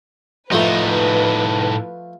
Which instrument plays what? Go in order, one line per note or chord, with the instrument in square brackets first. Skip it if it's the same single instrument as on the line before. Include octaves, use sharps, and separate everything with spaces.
[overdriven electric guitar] A2 D#4 [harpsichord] F3 A3 [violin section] B4